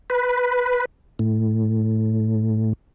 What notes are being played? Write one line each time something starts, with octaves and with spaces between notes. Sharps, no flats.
B4
A2